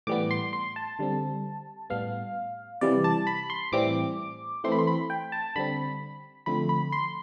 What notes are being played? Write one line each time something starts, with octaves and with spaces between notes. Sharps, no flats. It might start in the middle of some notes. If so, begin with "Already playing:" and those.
A2 E3 G3 B3 D6
C6
C6
A5
D3 G3 C4
A2 G3 B3 F5
C3 E3 G3 D5
A5
B5
C6
A2 E3 G3 C4 D6
E3 A3 C4 C6
B5
C6
B5
G5
A5
D3 G3 C4 B5
D3 F3 A3 C4 B5
B5
C6